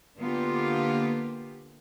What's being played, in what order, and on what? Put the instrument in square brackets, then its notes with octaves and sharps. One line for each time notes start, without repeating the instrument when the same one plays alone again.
[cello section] D3 A#3 B3 F4 G4